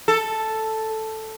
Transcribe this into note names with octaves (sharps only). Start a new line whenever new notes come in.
A4